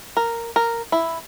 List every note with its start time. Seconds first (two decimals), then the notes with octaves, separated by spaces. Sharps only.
0.17 A#4
0.56 A#4
0.92 E4